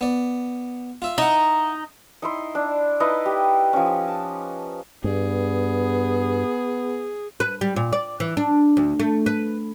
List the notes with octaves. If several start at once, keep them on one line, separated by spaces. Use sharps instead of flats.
B3 D5
F4 E5
D#4 E4 F#5
D#4 E4 C6
D4
D#4 E4 B4 D#5
G4
F3 C#4
A5
G2 B3 G#4
B4
G3
A#2
D5
E3
D4
D2
A3
B4